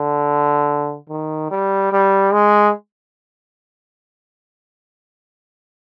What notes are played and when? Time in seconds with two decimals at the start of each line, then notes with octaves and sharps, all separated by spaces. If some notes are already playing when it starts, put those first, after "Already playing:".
Already playing: D3
1.09 D#3
1.51 G3
1.92 G3
2.33 G#3